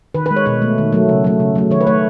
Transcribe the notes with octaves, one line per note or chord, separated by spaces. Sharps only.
D#3 B4
B4
G#3
C#5
B2 B4
A3
D#3
F#3 A3
C#3
F#3 A3
C#3
F#3 A3
D#3 C#5
B4
A3 C#5